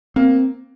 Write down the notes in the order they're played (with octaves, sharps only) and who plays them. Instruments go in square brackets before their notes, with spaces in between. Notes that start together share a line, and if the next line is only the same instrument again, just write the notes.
[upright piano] A#3 [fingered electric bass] C4